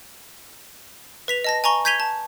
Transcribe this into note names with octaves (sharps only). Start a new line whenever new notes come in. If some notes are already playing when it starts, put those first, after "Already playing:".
B4 B6 F7
D#5 A5 A#6
G#5 A#5 C#6 G7
G6 G#6 B6 D#7 F7 G7
A5